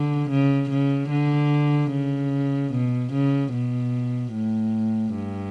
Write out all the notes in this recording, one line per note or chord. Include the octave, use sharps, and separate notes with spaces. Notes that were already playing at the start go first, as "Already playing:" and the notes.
Already playing: D3
C#3
C#3
D3
C#3
B2
C#3
B2
A2
G2